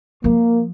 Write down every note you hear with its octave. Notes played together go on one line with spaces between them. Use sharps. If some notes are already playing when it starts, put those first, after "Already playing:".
F3 A#3